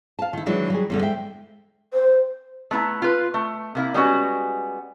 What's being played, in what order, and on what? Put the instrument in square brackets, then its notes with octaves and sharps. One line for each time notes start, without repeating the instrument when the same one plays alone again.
[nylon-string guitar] F5 A5
D#3 E4
D#3 E3 F#3 G#3 D4 E4
F#3 G3 G#4
E2 G2 D3
G#3 E5 G5
[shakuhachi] C5
[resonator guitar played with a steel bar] A3 B3 E4 A#5
F4 B4
A3
C3 A#3 E4
G3 G#3 B3 C#4 F4 F#4